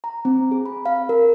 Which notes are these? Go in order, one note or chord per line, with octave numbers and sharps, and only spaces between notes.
A#5
C4
G#4
B5
F5
A#4